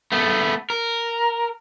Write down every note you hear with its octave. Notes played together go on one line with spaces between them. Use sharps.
A3 B3
A#4